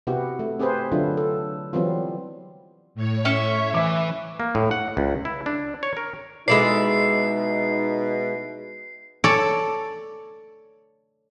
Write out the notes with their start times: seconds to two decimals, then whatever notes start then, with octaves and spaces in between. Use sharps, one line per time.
0.07 C3 B3 E4 F#4 G4
0.39 A3
0.59 C4 G4 G#4 B4 C5
0.92 D3 F#3 D4 E4 F4
1.17 A4
1.73 E3 F#3 G3 B3 C4 F4
2.95 A2 C#5
3.25 C#4 E5 C#6
3.74 E3 E5 D6
4.40 A#3
4.55 A2
4.71 F#5
4.97 C#2
5.25 E4
5.46 D4
5.83 C#5
5.97 A#4
6.48 B2 G#3 D#4 E4 D5 C7
9.24 A4 C#5 D5